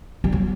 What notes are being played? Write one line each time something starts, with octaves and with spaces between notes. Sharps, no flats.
G3
F#3